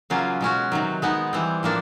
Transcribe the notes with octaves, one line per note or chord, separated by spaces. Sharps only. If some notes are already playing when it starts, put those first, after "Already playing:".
C#3 F#3 A#3 C#4 F4
B2 G#3 C#4 F#4
C3 D#3 F#3
G#3 B3 D#4
E3 G3 C4
A2 F3 A#3 D4